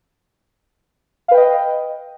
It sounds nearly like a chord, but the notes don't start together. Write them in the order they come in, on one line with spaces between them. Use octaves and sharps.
F5 B4 G5 D#5